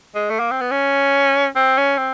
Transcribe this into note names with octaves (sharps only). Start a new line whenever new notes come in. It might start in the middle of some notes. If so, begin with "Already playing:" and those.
G#3
A3
A#3
C4
B3
C#4
C4
C#4
C4